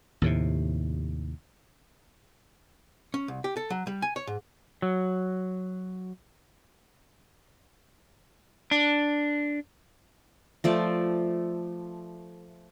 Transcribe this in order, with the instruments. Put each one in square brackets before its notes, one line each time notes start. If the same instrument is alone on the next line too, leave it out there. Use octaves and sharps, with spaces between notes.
[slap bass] D#2 A2 C3
[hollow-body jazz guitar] C#4
C2
G4
A4
F#3
G3
G#5
C#5
G#2
[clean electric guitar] F#3
D4
[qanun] F3 A3 D5